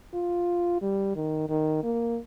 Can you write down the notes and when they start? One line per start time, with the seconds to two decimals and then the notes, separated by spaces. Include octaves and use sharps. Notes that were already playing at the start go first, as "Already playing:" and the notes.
0.14 F4
0.82 G3
1.16 D#3
1.49 D#3
1.83 A#3